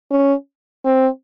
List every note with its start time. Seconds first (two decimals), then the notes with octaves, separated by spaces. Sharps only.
0.11 C#4
0.85 C4